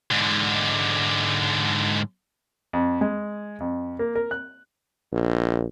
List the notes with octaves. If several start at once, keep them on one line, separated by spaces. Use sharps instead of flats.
G#2 D3
F2
G#3
F2
A#3
A#4
F#6
A#1